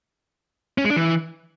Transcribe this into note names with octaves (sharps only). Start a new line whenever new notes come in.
C#4
G#3
D4
E3